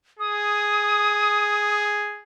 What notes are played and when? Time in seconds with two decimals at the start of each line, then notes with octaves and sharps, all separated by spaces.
0.19 G#4 D#6